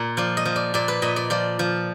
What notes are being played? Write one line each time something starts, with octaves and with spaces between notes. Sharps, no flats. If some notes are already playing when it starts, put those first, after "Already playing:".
Already playing: A#2 A#4
F3 D5
D#5
F3
D5
A#2 D5
B4
A#2 D#5
D5
F3 D5
F3